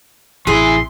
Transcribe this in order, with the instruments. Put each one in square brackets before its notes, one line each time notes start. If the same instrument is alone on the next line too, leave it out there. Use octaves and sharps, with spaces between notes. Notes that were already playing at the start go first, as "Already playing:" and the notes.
[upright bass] A1 C3 [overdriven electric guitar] E3 E4 [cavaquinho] G#4 [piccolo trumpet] C6